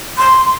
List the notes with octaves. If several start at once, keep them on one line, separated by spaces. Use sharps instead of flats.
C6